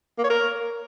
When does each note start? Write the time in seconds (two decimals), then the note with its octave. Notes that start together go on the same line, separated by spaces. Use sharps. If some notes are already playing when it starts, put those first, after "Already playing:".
0.18 A#3
0.24 C#5
0.30 A#4